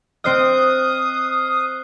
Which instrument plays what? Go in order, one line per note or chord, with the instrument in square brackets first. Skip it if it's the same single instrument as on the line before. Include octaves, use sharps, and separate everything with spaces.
[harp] C4 C5 D#5 [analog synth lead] D#6 [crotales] F6 F#6 C7